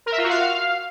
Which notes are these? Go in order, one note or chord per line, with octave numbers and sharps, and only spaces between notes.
A#4
E5
F4
F#4
F5